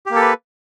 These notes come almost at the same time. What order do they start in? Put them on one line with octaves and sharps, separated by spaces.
G4 A#3 A4 B4